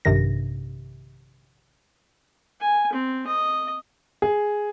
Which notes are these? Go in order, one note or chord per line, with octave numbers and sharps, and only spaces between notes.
A#1 G2 C3 D#3 A#6
G#5
C4
D#5
G#4